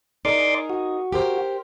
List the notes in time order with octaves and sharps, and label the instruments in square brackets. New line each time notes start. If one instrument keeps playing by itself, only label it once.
[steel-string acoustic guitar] D#4 G#4 A#4 [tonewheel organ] D5 C6 D6
[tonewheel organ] F#4
[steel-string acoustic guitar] G4 A#4 C5